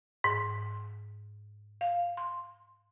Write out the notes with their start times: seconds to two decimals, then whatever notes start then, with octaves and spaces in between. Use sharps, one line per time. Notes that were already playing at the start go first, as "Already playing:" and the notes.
0.24 G#2
1.81 F5
2.17 C6